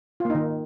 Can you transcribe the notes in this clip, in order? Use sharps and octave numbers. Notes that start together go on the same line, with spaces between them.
D#3 A#3 D#4 F4